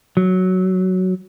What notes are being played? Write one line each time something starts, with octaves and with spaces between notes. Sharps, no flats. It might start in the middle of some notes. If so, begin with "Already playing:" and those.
F#3